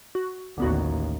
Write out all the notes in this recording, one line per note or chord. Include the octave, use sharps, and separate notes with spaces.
F#4
A1 D#2 D3 B3 F#4